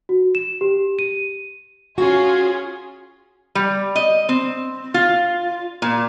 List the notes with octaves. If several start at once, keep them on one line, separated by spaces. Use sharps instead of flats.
F#4
E7
G4
D#7
C#4 F4 F#4 G#4
G3
D#5
C4
F4
A#2